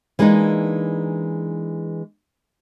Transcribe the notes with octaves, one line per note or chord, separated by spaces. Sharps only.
E3 G#3 A#3 D4 D#4